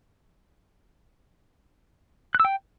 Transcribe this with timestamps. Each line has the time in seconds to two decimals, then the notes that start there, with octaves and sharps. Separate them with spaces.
2.35 F#6
2.40 E6
2.45 G5